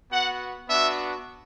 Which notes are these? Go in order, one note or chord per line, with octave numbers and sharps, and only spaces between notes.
B3 F#4 F#5
B3 D4 F#4 E5